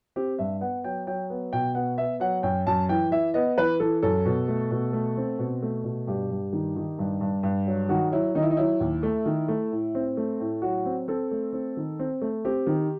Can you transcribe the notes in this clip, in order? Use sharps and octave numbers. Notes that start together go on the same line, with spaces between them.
C4 G4
G2 E5
B3 F#5
F#3 G5
F#3 G5
B3
B2 G5
B3 F#5
B3 E5
F#3 F#5
F#2 G5
F#2 A5
E3 G5
E3 E5
B3 D#5
E3 B4
E3 A4
F#2 A4
B2
A3
B2
A3
C4
B2
A3
B2
G2 G4
G2
D#3
D#3
G2
G2
G2
F#3
D#3 F#4
F#3 E4
D#3 D#4
E4
D#4
F#3 E4
D#2
A3
D#3
A3
A2
C4
A3
A2
F#3 F#4
C4
C4 A4
A3
C4
D#3
C4
A3
C4 G4
D#3